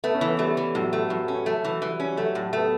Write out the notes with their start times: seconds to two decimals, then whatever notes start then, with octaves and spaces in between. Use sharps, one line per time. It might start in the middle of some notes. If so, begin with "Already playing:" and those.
0.04 A3 B3
0.15 C#4
0.21 E3
0.27 B3
0.39 G3 A3
0.57 E3
0.75 A2 F#3
0.93 A3
1.10 A2 F#3
1.28 C#4
1.46 F#3 A3
1.63 E3 F#3
1.81 E3 G3
1.99 G3 C#4
2.17 F#3 A3
2.35 A2
2.41 F#3
2.53 A3 B3